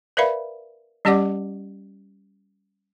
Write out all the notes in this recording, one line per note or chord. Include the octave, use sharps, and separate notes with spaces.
A#4 B4 D5 E5 F5 B5
G3 C#4 G4 D5 F#5 D6